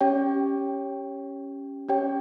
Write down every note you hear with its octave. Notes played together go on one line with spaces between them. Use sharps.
C#4 G4 C#5 G5
C#4 G4 C#5 G5